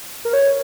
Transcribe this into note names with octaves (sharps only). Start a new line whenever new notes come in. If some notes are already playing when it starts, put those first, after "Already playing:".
A#4
C#5